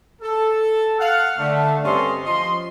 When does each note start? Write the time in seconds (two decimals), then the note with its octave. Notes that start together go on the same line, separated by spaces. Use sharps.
0.22 A4
1.00 F5 F#5
1.39 D3 A3
1.84 G2 C4 C#4 A4 D#5 C6
2.25 F3 D#5 C6